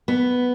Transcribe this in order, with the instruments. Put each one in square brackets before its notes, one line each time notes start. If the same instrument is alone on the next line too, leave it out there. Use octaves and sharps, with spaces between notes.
[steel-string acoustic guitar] B3